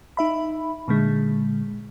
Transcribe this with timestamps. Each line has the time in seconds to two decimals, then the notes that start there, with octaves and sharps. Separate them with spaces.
0.17 D#4 E5 B5
0.88 A#2 D3 G#3